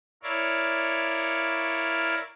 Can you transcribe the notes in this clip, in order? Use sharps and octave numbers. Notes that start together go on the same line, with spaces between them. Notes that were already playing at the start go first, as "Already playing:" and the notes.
E4 A#4 C#5 D5 F5